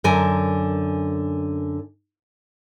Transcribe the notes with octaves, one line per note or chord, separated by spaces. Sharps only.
F#2 D3 A#4 G#5